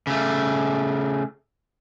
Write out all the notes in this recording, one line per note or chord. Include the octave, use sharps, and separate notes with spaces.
C#3 A3